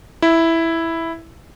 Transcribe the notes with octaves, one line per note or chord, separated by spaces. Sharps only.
E4